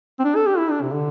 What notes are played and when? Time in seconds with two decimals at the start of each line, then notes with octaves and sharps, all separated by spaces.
0.19 C4
0.24 D4
0.36 A4
0.47 G4
0.58 E4
0.70 D4
0.82 C3
0.92 D3